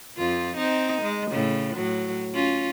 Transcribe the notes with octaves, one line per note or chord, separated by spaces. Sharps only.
F2 F4
C4 D#4
G#3
A2 C#3
A2 F#3
C#4 F4